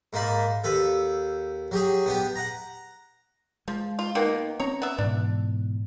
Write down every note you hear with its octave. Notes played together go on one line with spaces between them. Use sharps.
G#2 A#3 D#4 A5 B5
D#2 A4 B4
F#3 G4 G#4
B3 D4 G4
F#5 A#5
F3 G#3
F4
B2 D#3 A#3
C4 C#4 C#5 A#5
B3 E5
G#2 B2 E3 D4